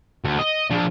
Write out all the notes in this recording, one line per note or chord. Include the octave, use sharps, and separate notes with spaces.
D2
D#5
F3 D4